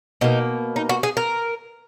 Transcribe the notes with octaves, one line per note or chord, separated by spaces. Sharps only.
B2 A#3 D#4
D#4
F#4
G#4
A#4